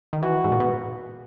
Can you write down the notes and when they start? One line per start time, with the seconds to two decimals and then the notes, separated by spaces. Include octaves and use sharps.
0.13 D#3
0.23 E3 F#4
0.44 G#2
0.52 A#2
0.60 B2